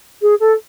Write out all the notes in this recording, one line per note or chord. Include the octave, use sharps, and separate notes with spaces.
G#4
A4